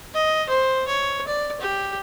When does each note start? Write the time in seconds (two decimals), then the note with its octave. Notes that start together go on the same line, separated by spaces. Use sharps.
0.14 D#5
0.49 C5
0.88 C#5
1.27 D5
1.61 G4